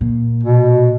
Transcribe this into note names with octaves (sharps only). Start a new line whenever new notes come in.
A#2
B2